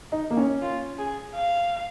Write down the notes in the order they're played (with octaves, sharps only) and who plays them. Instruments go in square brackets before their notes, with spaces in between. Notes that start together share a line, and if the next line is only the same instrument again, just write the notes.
[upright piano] D#4
A#3
C#4
[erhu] F4
G#4
F5